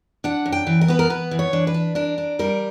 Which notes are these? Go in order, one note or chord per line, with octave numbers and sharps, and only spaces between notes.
D4 F#5
F#2
G5
E3
A#4
B3 B4
A#4
B3 B4
E3
C#5
D4
B4
D4
D4 A#4
D4
G3 A#4